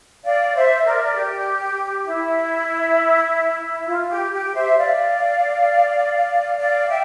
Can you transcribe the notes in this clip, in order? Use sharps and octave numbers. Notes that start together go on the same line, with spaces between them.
D5 F5
C5 E5
A#4 D5
G4
E4
F4
G4
G4
C5 E5
D5 F5
D5 F5
E5 G5